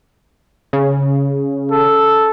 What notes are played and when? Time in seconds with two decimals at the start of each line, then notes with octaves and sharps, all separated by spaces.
0.73 C#3
1.72 A4